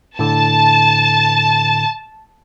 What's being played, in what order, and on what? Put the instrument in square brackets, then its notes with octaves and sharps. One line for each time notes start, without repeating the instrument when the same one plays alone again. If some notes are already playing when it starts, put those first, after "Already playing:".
[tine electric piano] A2 D3 [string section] A5